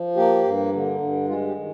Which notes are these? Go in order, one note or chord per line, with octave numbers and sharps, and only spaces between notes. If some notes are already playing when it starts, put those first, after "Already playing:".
Already playing: F3
A#3 G4
G2
D3
G2
G#3 F4
G4
D#3